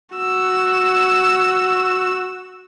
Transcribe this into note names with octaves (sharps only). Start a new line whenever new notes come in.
F#4 E6